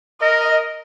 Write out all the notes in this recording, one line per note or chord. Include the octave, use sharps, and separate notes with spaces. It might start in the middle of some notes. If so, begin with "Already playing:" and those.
A#4 D#5